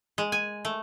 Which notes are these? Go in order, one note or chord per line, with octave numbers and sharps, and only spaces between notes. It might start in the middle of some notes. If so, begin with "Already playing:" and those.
G#3
G#5
A3